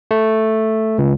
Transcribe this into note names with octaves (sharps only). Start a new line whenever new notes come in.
A3
C#2